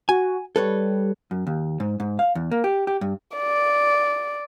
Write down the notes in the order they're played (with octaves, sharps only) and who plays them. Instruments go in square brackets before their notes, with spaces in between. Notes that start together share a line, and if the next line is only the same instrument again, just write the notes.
[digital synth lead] F#4 [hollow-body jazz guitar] G#5
[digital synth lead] G3 [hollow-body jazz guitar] A4 B4 C#5
[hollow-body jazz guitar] F#2
D#2
G#2
G#2
F5
E2
A#3
G4
G4
G2
[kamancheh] D5